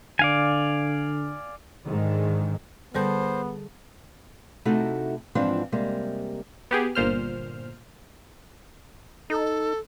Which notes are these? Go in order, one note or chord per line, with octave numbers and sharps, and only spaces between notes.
D3 D5 F5 G#5
G#2 D3 D#3 G#3
D3 G3 B3 G#4 A4 C5 G6
C3 A3 D#4 E4 F#4 A4
G#2 E3 F3 C4 D4 F4
C3 G3 G#3 A#3
B3 G4 G#4
G1 A#2 C5 F6
D#4 A4